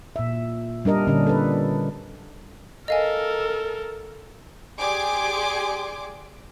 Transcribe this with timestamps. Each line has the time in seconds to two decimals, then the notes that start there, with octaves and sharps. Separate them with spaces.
0.16 A#2 E5
0.85 G3 D4 A#4 D#5
1.07 A#2 D3 C#4 D4
1.27 A4 B4
2.88 A4 A#4 D#5 F5 G#5
4.80 G4 G#4 D5 G#5 C6 D6